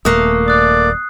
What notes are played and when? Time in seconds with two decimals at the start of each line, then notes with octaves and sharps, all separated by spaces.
0.05 D#1 A3 A#3 D#6 F#6 C7
0.48 D5 D#6 F#6